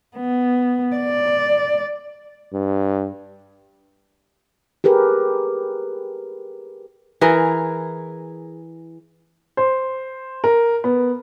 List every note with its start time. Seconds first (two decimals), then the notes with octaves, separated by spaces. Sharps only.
0.17 B3
0.96 D5
2.53 G2
4.84 G4 G#4 A#4 B4
7.21 E3 G#4 A#4
9.57 C5
10.44 A#4
10.84 B3